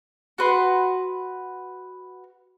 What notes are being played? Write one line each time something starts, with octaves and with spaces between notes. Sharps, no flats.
F#4 B4 C6